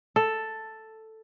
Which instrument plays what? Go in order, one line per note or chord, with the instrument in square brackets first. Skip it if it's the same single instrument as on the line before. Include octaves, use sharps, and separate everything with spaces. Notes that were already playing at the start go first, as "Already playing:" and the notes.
[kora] A4